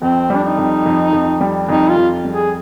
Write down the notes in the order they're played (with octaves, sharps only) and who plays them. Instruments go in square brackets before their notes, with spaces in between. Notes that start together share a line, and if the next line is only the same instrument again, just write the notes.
[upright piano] F2 [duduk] C4
[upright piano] G3
[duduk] D4
D#4
[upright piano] F2
F2
F2
G3
[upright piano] F2 [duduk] D#4
[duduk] F4
[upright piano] F2
G3
[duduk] G#4